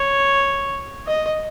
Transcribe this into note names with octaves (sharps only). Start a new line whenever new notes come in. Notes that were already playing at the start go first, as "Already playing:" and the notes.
Already playing: C#5
D#5